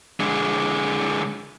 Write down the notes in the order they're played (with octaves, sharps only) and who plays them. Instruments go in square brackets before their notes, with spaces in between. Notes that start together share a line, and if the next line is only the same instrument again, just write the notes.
[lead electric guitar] D3 G#3